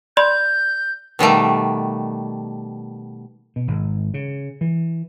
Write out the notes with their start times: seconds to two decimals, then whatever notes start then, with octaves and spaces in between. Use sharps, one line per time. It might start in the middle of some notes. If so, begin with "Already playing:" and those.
0.17 D5 B5 C6 G6
1.19 B2 D#3 G3 A3
3.56 B2
3.68 G#1
4.14 C#3
4.61 E3